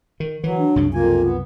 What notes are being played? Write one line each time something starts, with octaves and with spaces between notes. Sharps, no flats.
D#3
D#3 E3 F#3
D4
C2 F#2 C#3
F2 A#3 F4 G#5
B3